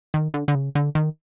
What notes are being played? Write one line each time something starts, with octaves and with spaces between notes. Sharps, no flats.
D#3
D3
D3
C#3
D3
D#3